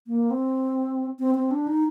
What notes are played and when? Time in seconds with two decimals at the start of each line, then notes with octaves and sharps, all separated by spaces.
0.07 A#3
0.31 C4
1.19 C4
1.35 C4
1.51 D4
1.67 D#4